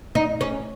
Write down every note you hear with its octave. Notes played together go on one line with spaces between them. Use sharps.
D#4
C#4